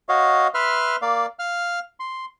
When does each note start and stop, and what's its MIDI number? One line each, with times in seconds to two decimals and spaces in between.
0.09 0.48 66
0.09 0.48 73
0.09 0.48 75
0.09 0.48 77
0.54 0.96 71
0.54 0.96 76
0.54 0.96 84
0.54 0.96 89
1.02 1.26 58
1.02 1.26 74
1.02 1.26 77
1.39 1.79 77
1.39 1.79 89
2.00 2.26 84